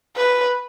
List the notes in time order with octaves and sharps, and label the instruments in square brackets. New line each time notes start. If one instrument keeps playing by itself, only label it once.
[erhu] B4